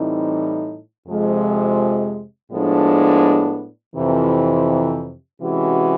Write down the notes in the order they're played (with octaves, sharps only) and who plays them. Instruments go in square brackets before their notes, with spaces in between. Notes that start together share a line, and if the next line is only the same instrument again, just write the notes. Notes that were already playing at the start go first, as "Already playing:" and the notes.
Already playing: [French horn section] A2 E3 G3 C4 D#4
F2 C3 F3 G#3
A2 F3 G#3 B3 D4
F2 C3 E3
C3 E3 G#3 C#4 F#4